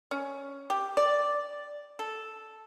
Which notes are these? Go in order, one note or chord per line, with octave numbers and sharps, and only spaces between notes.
C#4
G4
D5
A4